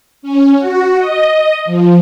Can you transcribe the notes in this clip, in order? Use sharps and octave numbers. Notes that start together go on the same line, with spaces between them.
C#4
F#4
D#5
F3